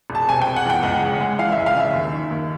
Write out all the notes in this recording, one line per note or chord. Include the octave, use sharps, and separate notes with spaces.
E1
A5
C3 G#5
G5
E1
F#5
E2 G5
C#2 F#5
C#3
G#3
E3 F5
E5
C#2
F5
C#3
E5
D#2
D#3
D#2